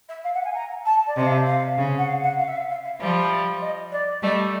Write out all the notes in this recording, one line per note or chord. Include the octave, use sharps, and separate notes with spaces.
E5
F5
F#5
G#5
A#5
A5
D5
C3 D#5
F5
E5
F5
C#3
F#5
F5
F#5
F5
E5
F5
F5
E5
F3 G3 E5
D#5
D5
G3 A3 D#5